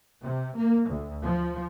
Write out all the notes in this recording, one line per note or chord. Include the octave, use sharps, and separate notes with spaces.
C3
A#3
D2
F3